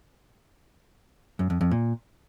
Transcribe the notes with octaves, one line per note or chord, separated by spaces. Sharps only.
F#2
F2
F2
A#2